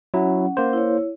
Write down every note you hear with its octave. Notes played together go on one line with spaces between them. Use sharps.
F#3 C#4 E4 F#5
A#3 C5
E4 C#5